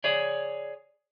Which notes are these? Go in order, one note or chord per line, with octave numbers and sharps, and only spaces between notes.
G#4 C#5 D5